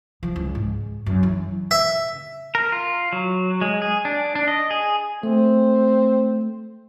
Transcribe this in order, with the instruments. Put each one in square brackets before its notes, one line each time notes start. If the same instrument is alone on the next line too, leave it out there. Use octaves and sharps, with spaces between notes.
[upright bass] F3
C#2
G#2
F#2
E3
[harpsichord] E5
[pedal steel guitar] A#4
F4
F#3
G#3
G#4
D4
D4
D#5
G#4
[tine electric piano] A3 [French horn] C4